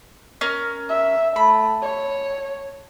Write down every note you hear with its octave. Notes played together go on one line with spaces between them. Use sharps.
C#4 A#4
E5
A3 B5
C#5